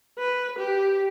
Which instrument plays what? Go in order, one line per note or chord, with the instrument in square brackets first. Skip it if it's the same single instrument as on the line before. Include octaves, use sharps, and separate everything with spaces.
[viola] B4
G4